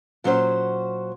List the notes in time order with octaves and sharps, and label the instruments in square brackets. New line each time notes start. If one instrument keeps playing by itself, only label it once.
[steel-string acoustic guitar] A#2 F#3 C#4 C5